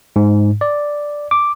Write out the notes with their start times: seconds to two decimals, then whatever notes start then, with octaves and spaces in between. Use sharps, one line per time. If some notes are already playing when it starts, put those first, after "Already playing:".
0.16 G#2
0.61 D5
1.31 D6